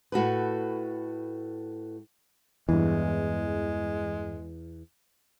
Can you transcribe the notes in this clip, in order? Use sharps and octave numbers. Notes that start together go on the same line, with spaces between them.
A2 F#4 A4 B4
E2 G2 E3 G#3